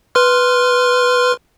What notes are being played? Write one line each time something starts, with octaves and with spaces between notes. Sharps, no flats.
B4 C6 F6